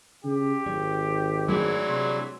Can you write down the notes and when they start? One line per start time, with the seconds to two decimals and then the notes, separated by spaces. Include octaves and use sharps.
0.24 C#3 G4
0.66 G#1 C#5
1.48 E3 F#3 G#3 D4
1.87 C3 C6